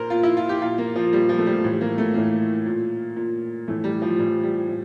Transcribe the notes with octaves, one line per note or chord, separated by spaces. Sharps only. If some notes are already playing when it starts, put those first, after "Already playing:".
Already playing: A#2 A#4 C5
A#2 F4
E4
F4
G4
A#2 F4
A#3
F3
A#2 G3
F3
A3
G3
A2 E3
A#3
A3
A2 E3 A#3
A#2
A#2
A2 E3 A3
G3
F3
A2 E3 G3
G3
A2